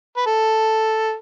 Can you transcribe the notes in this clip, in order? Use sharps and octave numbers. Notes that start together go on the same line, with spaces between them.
B4
A4